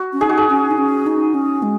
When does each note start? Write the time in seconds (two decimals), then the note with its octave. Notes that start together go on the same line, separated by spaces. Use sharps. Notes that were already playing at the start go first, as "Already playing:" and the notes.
Already playing: F#4
0.13 C#4
0.21 D#4 G#4
0.29 F#4
0.37 G#4
0.50 C#4
0.71 D#4
0.78 C#4
1.07 D#4
1.34 C#4
1.63 G#3